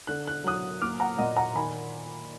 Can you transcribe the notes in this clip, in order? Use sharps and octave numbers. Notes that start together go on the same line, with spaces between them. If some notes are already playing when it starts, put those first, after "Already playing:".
D3 F#6
F#6
F#3 D#6 F#6
A#3 D6 F6
F#5 A#5
A#2 D#5 F#5
F#5 A#5
D#3 G#5 B5